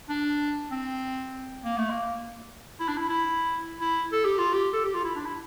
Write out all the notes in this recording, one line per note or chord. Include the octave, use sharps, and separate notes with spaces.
D4
C4
A#3
A3
A#3
E4
D4
E4
E4
E4
A4
G4
F4
G4
A4
G4
F4
E4
D4
E4